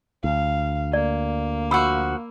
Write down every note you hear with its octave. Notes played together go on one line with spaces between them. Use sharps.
D2 F5
A#3 D5
F3 F#4 B5 E6